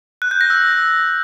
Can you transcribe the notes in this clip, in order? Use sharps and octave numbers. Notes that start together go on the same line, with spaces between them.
F#6
G6
A#6
E6